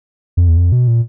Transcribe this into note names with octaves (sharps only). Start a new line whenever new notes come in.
F2
E2
F2
B2
A#2